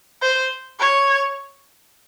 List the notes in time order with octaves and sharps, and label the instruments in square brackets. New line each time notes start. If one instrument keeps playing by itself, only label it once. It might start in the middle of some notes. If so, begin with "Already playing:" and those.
[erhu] C5
C#5